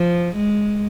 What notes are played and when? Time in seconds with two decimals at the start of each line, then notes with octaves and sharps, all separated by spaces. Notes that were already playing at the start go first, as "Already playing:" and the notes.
Already playing: F3
0.36 G#3